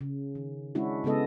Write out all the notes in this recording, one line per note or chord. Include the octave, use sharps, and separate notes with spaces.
C#3
D#3
G#3 C#4 D4 E4 F#4
C#3 G#3 B3 A4 D#5